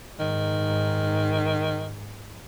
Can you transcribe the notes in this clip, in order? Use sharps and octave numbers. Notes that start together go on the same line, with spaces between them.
G#2 D#3